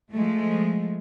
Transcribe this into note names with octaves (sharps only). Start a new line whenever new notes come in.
F3 G#3 A3